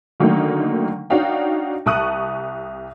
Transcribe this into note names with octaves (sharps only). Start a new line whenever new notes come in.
D3 D#3 F#3 A3 A#3 D#4
D4 D#4 F#4 C#5 F5 G5
C2 A5 C#6 D#6 F#6 D#7